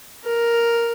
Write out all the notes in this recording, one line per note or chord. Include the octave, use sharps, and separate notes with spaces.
A#4